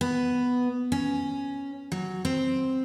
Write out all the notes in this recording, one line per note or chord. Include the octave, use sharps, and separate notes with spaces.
B3
C#4
F#3
C4